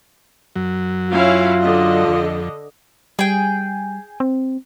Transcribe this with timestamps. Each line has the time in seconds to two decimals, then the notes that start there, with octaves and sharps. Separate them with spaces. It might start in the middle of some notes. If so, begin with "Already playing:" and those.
0.56 F#2 F#3
1.11 C#4 E4 F4 F5
1.62 D3 D#5
2.08 F2
3.19 G3 G#4 G5
4.20 C4